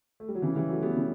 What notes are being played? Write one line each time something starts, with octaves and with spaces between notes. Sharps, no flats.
A3
G3
F#3
C#3 E3
E3 G3
F#3 A3
G3 B3
C#3